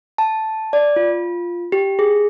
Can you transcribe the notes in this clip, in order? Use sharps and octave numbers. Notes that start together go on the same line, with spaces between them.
A5
D5
F4
G4
G#4